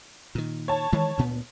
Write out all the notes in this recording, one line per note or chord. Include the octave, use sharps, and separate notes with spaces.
A#2 D#3
C#5 A5
D#3 E3 G#3
D2 A#2 B3